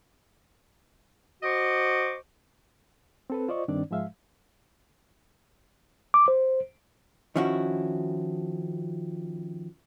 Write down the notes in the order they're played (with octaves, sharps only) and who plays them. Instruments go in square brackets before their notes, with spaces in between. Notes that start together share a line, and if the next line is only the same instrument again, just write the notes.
[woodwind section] F#4 C5 D#5 C#6 D6
[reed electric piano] C4 A4 B4
F4 C5 D5 D#5 C#6
G2 D#3 C4 D4 D5
G#2 F3 G#3 E5 F5
[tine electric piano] D6
C5
[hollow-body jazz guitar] D#3 F3 C#4 E4 F#4